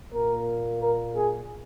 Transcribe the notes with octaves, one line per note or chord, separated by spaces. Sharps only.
A#2 A#3 A#4
A#4
G#4